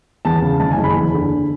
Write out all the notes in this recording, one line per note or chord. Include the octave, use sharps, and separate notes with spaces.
E2 A5
C#3
F#1 A5
G#5
F#1
B5
E2
D3